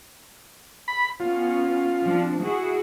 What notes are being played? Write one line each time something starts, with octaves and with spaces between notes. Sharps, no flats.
B5
B3 C#4 F4
F3 C4 D4
E4 F#4 G#4